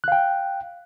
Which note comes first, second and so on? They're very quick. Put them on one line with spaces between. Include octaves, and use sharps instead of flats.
F#6 F5 G5